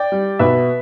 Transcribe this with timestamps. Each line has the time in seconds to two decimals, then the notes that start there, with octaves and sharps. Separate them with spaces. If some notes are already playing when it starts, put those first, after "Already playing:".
Already playing: D5 G5
0.12 G3
0.39 B2 B4 E5